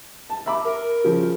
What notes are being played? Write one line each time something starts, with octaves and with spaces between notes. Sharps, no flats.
A5
E5 B5 D6
A#4
C#3 F3